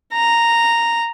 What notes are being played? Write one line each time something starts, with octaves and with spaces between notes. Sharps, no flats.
A#5